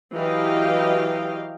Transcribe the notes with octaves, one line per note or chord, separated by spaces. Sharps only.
E3 F#3 G4 D#5 F5 G5